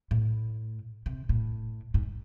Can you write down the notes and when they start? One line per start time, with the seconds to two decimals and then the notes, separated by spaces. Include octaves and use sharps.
0.11 A2
1.06 C3
1.29 A2
1.94 G#2